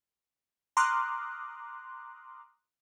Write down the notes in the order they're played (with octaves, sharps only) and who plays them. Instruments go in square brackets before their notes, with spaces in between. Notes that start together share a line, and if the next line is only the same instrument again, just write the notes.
[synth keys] A#5 C6 D6 D#6 F6 F#6